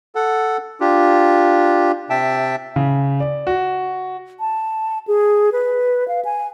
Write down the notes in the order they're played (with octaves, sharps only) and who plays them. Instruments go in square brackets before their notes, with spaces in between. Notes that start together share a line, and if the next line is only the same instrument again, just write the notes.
[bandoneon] A4 F#5
D4 F4 G4
C3 E5 G5 A5
[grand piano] C#3
D5
F#4
[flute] A5
G#4
B4
F5
G#5